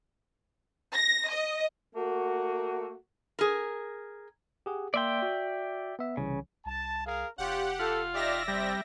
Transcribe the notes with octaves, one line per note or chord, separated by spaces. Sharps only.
A#6
D#5
A3 A#3 F#4
G#4 A#4
G4 G#4 F#5
A#3 D5 E5 G5 C6
F#4
B3 E5
C2 C#3 E3
C2 A5
G#4 A#4 F5
F1 C#4 F4 G4 F#5
F4 A4
D#4 G4 D5 E5 A#6
G3 C4